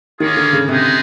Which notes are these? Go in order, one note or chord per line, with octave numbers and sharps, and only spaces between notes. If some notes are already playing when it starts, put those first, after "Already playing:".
D#3 A#3 C#4 F4 G#4 C#5
D3
C#3
C3 G#3 B3 D#4 G#4 C5